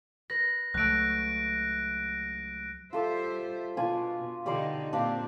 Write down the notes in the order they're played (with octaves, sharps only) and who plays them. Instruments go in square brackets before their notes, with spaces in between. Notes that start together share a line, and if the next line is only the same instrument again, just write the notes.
[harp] B4 [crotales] A#6
[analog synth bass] C#2 [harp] F#3 A3 [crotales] F#6 D7
[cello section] G3 C5 E5 [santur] F4 A4 D6
[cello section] B2 [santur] D4 F4 G#5
[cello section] B2 D3 D#4 [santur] G3 D5 C6
[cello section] A#2 C4 [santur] D4 G4 F5